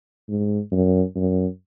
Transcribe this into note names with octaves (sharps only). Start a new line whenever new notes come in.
G#2
F#2
F#2